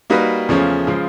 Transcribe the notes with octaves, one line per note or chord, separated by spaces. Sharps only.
G3 A#3 D#4 F#4 B4
E2 C#3 F3 A3 C#4
C#3 F3 G#3